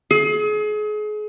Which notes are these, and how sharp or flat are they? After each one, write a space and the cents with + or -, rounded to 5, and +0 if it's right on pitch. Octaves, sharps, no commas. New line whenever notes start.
G#4 +35